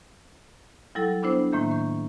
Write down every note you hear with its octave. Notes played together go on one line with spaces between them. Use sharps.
F#3 G3 E4 A4
B3 D4 E4 C5
A2 D#3 A#3 E5 G6
C#6